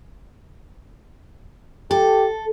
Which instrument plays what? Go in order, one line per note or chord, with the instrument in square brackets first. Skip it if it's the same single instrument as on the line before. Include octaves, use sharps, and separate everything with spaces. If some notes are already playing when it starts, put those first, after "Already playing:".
[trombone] G4 [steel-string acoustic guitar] A4